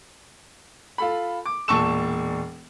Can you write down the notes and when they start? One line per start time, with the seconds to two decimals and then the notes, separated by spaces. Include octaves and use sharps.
0.98 F4 A4 B5
1.46 D6
1.68 E1 A#2 A5 C#6 E6 E7